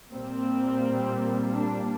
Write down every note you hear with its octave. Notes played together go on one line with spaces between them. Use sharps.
A#2 G3 A#3 C4
D4